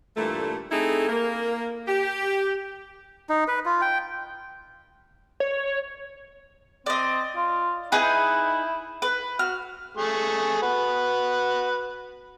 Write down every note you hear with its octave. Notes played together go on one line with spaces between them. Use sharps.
G2 A#2 E3 A3
A3 C4 D#4 E4 G#4 A4
A#3
G4
D#4
B4
F4
G5
C#5
C4 D5 D#5
F4
D#4 E4 G#4 B4
B4
F#4 F6
A3 G#4 C#6
F#4 B4